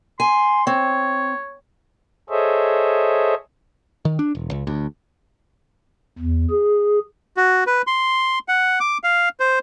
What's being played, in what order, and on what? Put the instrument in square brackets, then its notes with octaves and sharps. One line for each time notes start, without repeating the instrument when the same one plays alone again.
[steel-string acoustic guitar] G#5 [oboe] C6
[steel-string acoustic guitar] C4 [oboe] C#5
[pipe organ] G#4 A4 C5 C#5 D#5 E5
[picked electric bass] D#3
D4
E1
C#2
D2
[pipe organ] E2
G#4
[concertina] F#4
B4
C6
F#5
D6
F5
C5